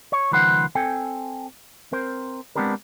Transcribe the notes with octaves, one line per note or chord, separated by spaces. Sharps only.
C#5
C#2 D#3 F3 B4 C5 F#5
C4 A4 G5 G#5
C4 A#4 C5
G#3 B3 C4 D4 G4 A#4